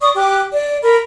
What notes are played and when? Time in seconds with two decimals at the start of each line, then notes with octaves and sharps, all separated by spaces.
0.01 D5 C#6 D#6
0.15 G4 D6 F#6
0.52 D5
0.82 A#4 B5